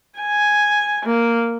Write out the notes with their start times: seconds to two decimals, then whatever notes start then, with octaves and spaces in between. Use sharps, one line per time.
0.19 G#5
1.06 A#3